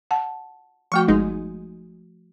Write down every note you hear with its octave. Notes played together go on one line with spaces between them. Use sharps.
F#5 A5
F3 A3 F#4 G5 C#6
G1 G#3 D#4